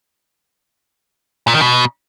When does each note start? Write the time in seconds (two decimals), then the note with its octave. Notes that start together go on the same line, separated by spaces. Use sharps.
1.48 A#2
1.54 D#3
1.61 B2